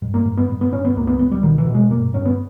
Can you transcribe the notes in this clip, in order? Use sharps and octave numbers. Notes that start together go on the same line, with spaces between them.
G2
A#3
G2
B3
G2
B3
G2 C#4
B3
C#2 A#3
B3
C#2 B3
G3
B2 D#3
E3
B2
G#3
G2 A#3
G2 C#4
B3